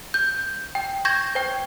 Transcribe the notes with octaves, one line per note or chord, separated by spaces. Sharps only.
G6
G5
C#6 G6 G#6 A#6 E7
C5 G5